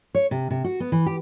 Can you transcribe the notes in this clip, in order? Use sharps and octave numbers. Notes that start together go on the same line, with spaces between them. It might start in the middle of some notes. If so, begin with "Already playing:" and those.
C#5
C3
C3
F#4
B3
E3
G4